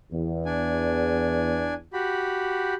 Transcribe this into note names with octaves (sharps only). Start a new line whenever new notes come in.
E2
D4 G#5
F#4 G4 B5